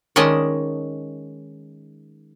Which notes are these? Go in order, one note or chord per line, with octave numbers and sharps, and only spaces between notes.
D#3 G#3 C#4 D5 D#5 A5